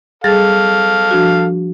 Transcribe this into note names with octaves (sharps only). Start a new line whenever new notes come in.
G3 G#4 A4 F5 A6
F3 D4 F#4